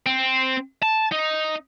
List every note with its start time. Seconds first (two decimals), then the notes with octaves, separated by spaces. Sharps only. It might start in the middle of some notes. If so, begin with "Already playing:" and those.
0.06 C4
0.83 A5
1.12 D#4